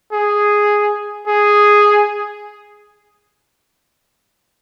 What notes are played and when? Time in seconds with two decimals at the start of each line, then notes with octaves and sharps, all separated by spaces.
0.12 G#4
1.28 G#4